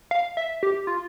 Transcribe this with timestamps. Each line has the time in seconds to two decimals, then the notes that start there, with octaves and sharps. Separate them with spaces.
0.11 F5
0.37 E5
0.63 G4
0.87 F4